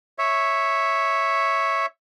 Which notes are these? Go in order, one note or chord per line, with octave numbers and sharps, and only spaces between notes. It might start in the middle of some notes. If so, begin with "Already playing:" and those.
C#5 E5